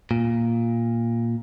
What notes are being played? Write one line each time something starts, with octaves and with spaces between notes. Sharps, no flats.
A#2